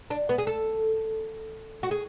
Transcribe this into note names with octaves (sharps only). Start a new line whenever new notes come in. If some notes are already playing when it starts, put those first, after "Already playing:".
D4
B3
G#4
A4
F#4
G#4